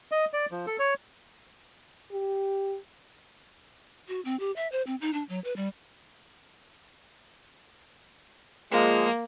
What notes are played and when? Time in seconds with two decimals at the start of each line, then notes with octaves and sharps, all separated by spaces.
0.12 D#5
0.33 D5
0.51 F3
0.67 A4
0.79 C#5
2.12 G4
4.08 F#4
4.25 C4
4.40 G4
4.56 E5
4.72 C5
4.87 C4
5.01 D#4
5.14 D4
5.29 F#3
5.44 B4
5.56 G3
8.71 A#2 F3 G#3 A#3